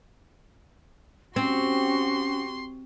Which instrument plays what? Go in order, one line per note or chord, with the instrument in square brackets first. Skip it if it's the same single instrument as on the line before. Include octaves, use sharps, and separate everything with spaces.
[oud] C4 [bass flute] C#4 [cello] F#4 G4 [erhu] C6